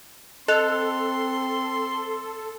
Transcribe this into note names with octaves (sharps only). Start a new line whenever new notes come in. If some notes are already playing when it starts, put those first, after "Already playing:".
C4 A4 D#5 C6 F#6 F7